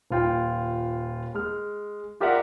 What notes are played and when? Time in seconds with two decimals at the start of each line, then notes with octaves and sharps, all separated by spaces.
0.11 D#1 F4 G5
1.34 G#3 F6
2.20 F4 G4 A#4 D5 E5 F#5